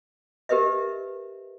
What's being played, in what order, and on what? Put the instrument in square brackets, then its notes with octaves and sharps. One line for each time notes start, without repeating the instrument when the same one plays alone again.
[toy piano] G4 A#4 B4 D#5 E5